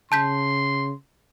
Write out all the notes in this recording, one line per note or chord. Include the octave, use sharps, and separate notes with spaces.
C#3 A5 C6 G6 B6